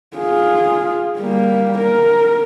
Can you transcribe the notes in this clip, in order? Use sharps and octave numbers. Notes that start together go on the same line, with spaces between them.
F4 G#4
G3 A#3
A#4